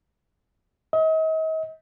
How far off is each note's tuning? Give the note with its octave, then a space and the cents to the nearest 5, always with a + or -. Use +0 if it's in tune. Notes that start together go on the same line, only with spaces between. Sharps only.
D#5 +40